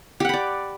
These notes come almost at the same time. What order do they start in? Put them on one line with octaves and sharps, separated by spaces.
G4 F#5 B5 D5